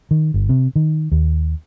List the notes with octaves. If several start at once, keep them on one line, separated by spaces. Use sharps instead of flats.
D#3
G1
C3
D#3
D#2